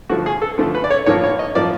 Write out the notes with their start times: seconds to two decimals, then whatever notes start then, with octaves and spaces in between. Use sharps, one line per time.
0.09 D3 F3 A3 F#4
0.26 G#4
0.42 A4
0.58 D3 F3 A3
0.75 B4
0.84 D5
0.91 C#5
1.06 A2 F3 A#3 C#5
1.24 C#5
1.39 D#5
1.55 A2 F3 A#3 D5